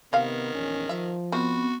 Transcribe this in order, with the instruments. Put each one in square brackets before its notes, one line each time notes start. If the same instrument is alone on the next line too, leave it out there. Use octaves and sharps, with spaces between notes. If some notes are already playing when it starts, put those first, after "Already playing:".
[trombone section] C3 B3 [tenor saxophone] D#3 [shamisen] D#5 F5
[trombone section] A#1 E2 C#4
[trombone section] F3 [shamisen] E5
[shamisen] D#3 [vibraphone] B3 C4 [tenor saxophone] F#4